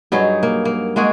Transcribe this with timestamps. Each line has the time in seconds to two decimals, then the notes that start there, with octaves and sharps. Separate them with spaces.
0.12 G2 F#3 D#4 G#4
0.43 A#3
0.65 A#3
0.96 G#3 A#3 F#4 G#4